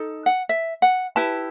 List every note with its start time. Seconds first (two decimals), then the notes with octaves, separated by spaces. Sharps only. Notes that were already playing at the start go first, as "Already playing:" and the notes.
Already playing: D#4 A4
0.26 F#5
0.49 E5
0.82 F#5
1.16 E4 G4 B4 A5